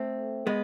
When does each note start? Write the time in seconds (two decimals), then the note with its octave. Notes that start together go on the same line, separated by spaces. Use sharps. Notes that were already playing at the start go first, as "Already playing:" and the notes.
Already playing: A3 C4
0.47 G#3 B3